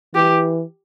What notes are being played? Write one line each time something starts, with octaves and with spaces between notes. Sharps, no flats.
E3 G4